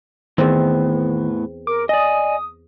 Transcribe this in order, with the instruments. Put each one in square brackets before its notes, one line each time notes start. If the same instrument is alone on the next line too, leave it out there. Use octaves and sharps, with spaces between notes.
[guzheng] E2 C4 [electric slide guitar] A2 B3 [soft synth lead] D#3
[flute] A#4 [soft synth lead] D6
[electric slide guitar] D5 D#5 [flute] G#5 [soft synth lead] D#6